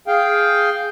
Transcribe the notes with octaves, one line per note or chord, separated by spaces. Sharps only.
G#4 F5 G5